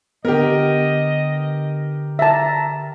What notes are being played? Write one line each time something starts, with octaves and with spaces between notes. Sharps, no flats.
D3 B3 G4 A#4 D#5
E5 A5 A#5